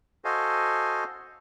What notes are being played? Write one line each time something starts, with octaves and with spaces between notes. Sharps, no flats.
F#4 A4 C5 D#5 F5 G#5